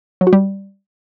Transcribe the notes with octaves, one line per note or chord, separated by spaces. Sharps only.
F#3
F#4
G3